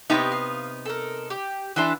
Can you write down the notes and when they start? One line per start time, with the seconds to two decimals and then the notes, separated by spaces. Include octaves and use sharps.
0.10 C3 B3 D#4 G4 C#5
0.32 F5
0.86 A4 A#4
1.30 G4
1.76 E3 D4 F#4 E5 C6